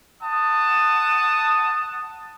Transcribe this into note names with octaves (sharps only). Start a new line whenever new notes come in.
F#5 A5 D#6